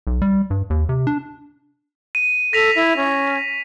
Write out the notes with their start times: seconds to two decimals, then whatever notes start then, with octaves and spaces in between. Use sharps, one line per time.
0.07 B1
0.22 G3
0.50 G2
0.70 D#2
0.89 C3
1.07 D4
2.15 D#7
2.53 A4 A#6 B6 F7
2.75 E4
2.97 C#4